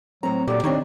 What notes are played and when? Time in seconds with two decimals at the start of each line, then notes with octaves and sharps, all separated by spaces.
0.23 A2 F#3 C4 A#5
0.48 A#2 D3 F#3 G4 D5
0.64 D#3 C4 D4 D#4 C#5